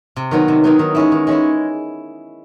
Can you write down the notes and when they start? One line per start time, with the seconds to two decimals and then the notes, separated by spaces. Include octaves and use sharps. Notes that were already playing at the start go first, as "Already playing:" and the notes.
0.16 C3
0.31 D#3 F#3 B3 D#4
0.48 C3
0.64 D#3 F#3 B3 D#4
0.79 D#3
0.95 G#3 C#4 E4
1.12 D#3
1.27 G#3 C#4 E4